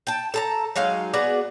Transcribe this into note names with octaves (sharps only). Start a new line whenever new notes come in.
G5 A5
A4 A5 A#5
F#3 G#3 D#4 F5
B3 F#4 G#4 D5